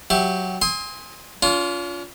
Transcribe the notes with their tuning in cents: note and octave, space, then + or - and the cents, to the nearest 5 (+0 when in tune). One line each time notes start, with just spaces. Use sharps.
F#3 +0 G4 +0 E5 +5
G#5 -35 C6 +10 D#6 +40
C#4 +45 F4 +0